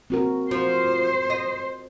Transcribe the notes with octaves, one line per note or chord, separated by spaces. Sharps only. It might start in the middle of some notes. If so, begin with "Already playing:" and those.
C4 F#4 A#4
F3 F#4 C5
D#5